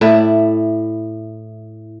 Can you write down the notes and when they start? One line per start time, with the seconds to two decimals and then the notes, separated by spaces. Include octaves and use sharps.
0.01 A2 E4 D5 E5